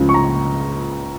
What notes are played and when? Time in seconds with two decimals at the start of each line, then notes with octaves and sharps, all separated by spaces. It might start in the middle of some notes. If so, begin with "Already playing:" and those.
Already playing: C#2 C#3 F3
0.09 C#6
0.14 A#5